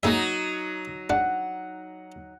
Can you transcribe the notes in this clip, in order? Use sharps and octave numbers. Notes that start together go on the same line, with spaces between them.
F#3 A#3 D#4 G#4 E5
D4 F#5